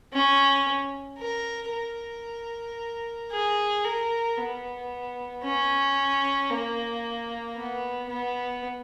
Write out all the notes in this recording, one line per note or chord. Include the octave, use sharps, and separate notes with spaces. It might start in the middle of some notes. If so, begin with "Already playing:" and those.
C#4
A#4
A#4
G#4
A#4
B3
C#4
A#3
B3
B3